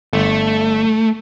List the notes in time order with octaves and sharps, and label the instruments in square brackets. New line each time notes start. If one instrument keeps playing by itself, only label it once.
[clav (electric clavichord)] G1 [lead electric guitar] A3